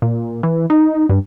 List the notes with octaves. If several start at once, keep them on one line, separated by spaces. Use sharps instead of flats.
A#2
E3
D#4
G2